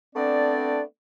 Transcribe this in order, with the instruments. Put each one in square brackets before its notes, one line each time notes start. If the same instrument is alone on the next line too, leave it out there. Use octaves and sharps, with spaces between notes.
[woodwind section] A3 B3 C4 D4 D5